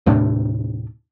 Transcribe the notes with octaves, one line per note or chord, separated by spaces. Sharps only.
D#2 A2 C3 D4